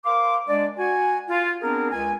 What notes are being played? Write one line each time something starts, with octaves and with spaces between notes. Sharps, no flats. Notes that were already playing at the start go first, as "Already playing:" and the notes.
A#4 C5 F5 C6 D6
G#3 D4 D5
F#4 G#5
F4
B3 C4 D4 G#4 A#4
C#2 G#5